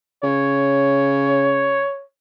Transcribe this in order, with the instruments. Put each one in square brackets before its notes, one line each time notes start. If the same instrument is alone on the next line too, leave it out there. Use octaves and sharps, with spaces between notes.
[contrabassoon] C#3 [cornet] C#5